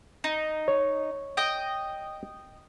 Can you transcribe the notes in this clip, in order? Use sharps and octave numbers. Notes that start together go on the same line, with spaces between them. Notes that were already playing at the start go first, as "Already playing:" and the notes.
D#4
C#5
D#5 G5